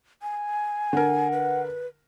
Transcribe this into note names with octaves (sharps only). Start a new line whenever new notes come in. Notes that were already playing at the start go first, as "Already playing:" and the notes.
G#5
D3 A#4 F#5
B4